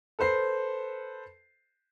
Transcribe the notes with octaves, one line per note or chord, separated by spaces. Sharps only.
A4 B4 C5 C7